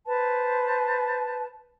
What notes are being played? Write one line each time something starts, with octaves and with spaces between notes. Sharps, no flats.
B4 C5 A5